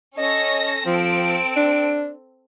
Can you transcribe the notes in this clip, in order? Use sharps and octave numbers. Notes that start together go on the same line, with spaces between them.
C#4 A4 D#5 A#6
F3 C4 A4 D7
D4